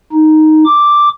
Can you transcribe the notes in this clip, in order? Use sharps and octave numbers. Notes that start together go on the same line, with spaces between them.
D#4
D6